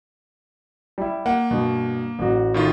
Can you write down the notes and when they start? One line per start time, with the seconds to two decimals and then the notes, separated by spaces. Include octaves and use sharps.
0.98 G3 E4
1.26 A#3 F#5
1.51 G2 B2
2.19 A1 F#4
2.54 A2 D#3 F4